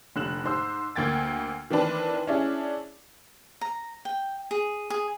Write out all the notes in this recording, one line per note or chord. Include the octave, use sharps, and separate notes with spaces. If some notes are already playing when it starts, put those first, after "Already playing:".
F1 D3 F#6 E7 F#7
G#2 C5 E6
D2 A#3 G5 G#6 A6
D#3 E3 C4 D4 B4
C#4 D4 E4 G#4
A#5
G5
G#4
G#4